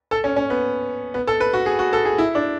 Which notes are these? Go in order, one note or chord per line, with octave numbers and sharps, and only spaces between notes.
A4
C#4
C#4
B3
B3
A4
B4
F#4
G#4
F#4
A4
G#4
E4
D4